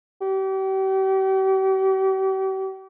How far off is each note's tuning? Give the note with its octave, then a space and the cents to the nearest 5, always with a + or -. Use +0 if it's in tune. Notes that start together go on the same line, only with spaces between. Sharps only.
G4 -40